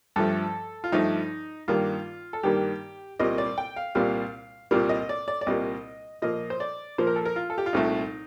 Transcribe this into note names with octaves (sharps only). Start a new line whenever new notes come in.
G2 F3 A3 A4
F4
G2 F3 A3 D#4
G2 D#3 G3 A#3 F4
A4
G2 D#3 G3 A#3 G4
C2 A#2 G3 A#3 D#5
D5
G5
F5
C2 A#2 G3 A#3 F5
C2 A#2 G3 A#3
D#5
D5
D5
D5
C2 A#2 G3 A#3 D#5
A#2 F3 A#3 D#5
C5
D5
A#2 F3 A#3 C5
A#4
A4
A#4
F4
A4
G4
F4
C2 A#2 A3 D#4